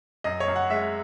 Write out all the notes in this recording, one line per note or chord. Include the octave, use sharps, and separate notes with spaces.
F#2 D#5
C#5
F#2
F#5
G#3 E5